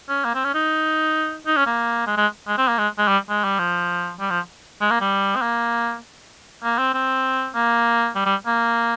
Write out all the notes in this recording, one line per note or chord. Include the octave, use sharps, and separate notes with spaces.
C#4
A#3
C4
C#4
D#4
D#4
C#4
A#3
G#3
G#3
G#3
C4
A#3
G#3
G#3
G3
G#3
G3
F3
G3
F3
G#3
A#3
G3
C4
A#3
A#3
C4
C4
A#3
G3
G3
A#3